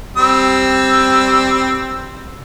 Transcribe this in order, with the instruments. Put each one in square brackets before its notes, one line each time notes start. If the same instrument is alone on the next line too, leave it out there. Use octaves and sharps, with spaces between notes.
[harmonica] G3 C4 E6